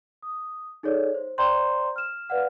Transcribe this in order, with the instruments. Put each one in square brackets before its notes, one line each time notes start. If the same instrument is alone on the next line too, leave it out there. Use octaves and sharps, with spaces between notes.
[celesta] D#6
D#4 G#4 A4 C#5 D5
C5
C5 D5 G5 A#5 C6 G6
F6 E7
B4 D5 F5 F#5 F6